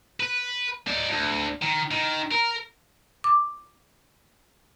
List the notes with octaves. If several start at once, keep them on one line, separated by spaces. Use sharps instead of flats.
B4
D#4 D5
D2
D#3
D#3
A#4
D6